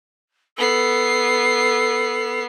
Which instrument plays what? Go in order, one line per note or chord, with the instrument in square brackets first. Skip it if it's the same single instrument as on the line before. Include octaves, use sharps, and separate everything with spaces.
[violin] B3 C7 [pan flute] A4